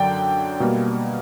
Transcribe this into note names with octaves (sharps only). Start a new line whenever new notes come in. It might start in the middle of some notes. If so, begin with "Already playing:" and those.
Already playing: F#2 D3 F#3 D5 G5
B2 G3 A#3